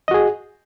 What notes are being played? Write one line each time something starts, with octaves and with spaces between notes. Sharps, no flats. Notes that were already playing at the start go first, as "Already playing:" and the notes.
F#4 G#4 D#5